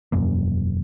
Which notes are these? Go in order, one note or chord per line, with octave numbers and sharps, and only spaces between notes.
E1 F#2 A#3